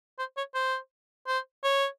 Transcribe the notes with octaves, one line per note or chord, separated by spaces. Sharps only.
C5
C#5
C5
C5
C#5